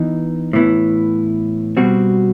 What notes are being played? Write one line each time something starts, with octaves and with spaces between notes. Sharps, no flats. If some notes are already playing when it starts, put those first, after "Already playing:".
Already playing: E3 B3 D#4
A2 E3 B3 E4
B2 G3 C4 F#4